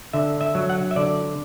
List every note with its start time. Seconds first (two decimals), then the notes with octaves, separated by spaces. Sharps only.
0.13 D3 E5
0.41 E5
0.55 F#3
0.70 F#5
0.91 E5
0.96 D3 D5